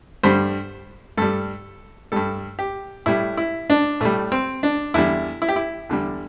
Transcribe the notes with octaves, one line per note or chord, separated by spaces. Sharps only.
G2 D3 G3 C5
G2 G3 A4
G2 G3 A4
G4
A2 G3 E4
E4
D4
A2 G3 A3
C4
D4
E2 D3 G3 E4
E4
G4
E4
E2 D3 G3